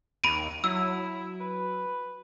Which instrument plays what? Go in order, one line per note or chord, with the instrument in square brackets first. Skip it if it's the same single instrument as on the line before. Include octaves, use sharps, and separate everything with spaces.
[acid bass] D#2 [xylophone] B5 D7 D#7
[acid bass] F#3 [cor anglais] E4 [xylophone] E6
[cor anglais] B4